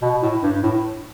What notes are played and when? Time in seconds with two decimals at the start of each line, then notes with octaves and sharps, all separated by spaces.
0.02 B2
0.22 A2
0.43 G2
0.63 A2